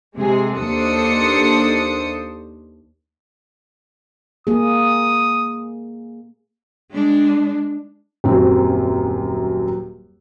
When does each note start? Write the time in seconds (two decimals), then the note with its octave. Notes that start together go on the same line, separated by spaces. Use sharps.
0.16 C3 G#3 G#4
0.61 D#2 D4 A4 C5 D#6 C#7
4.47 A#3 G#4 D#6
6.91 G#3 D4
8.24 D#1 F#2 F#3 C4